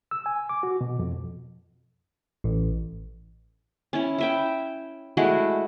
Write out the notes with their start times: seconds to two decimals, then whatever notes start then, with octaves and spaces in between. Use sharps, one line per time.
0.11 E6
0.26 G#5
0.49 D6
0.63 F#4
0.81 B2
0.99 F2
2.44 A1
3.93 C#4 E4
4.18 E4 E5 G5
5.17 G#3 A3 E4 F#4